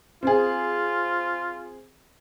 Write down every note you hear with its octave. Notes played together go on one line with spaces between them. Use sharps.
C4 F4 G#4